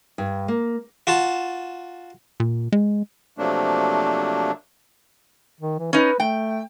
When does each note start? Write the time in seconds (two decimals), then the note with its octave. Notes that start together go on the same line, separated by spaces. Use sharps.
0.18 G2
0.48 A#3
1.07 F4 F#4 A5
2.40 A#2
2.72 G#3
3.38 C3 F3 F#3 A3 A#3 D4
5.60 D#3
5.79 E3
5.93 C#4 D#4 B4
6.20 A3 G5